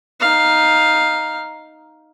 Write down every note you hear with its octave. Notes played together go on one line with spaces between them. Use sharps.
D#4 F5